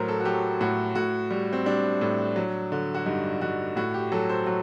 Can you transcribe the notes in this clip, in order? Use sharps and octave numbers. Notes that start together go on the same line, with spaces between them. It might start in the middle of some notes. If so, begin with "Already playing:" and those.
Already playing: A2 F#3 A#4 C5
A4
F#4
F#3 G4
A2 F#4
A2 F#4
G3
C4
G3 D4
A2
F#3
D3
F#4
G2 D#4
G2 F#4
A2 F#4
G4
F#3 A4
C5
F#3